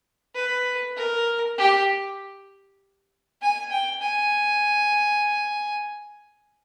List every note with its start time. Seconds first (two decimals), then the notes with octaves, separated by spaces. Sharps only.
0.35 B4
0.97 A#4
1.58 G4
3.42 G#5
3.71 G5
4.02 G#5